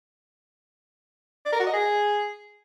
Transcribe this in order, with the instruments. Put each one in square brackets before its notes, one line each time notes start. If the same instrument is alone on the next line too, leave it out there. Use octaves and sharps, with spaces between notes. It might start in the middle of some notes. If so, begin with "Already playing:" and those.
[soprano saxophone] D5
A#4
F#4
D#5
G#4